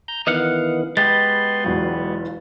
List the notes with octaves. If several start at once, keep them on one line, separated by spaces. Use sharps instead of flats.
A#5 G6
D#3 E3 B3 D#5 F5 F#5
G#3 B3 G4 B4 C6 A6
E1 E2 F#3 F4